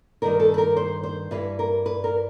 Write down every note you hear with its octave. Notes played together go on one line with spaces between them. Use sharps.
G2 D#3 G3 A#4
A4
B4
A#4
C5
C5
G2 E3 G3 B4
A#4
B4
A#4